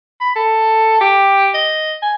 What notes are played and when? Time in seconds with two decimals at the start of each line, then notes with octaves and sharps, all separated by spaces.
0.21 B5
0.36 A4
1.01 G4
1.54 D#5
2.02 G#5